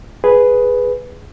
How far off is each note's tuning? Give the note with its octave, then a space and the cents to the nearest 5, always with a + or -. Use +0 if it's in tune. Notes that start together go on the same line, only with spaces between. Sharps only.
G#4 +0 B4 +0